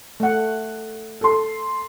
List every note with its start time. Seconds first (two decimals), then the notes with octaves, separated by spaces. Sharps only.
0.20 A3 F#5
1.21 A4 C6